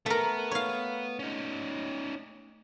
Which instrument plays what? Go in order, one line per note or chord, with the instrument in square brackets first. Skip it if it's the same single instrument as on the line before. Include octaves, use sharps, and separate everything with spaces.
[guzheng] A3 A#4 [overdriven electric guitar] B3
[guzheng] C#5 F5
[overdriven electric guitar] C#4 D#4